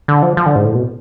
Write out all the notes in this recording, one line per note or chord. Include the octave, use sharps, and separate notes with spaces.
D3
F3
F3
D3
G#2
A2
B2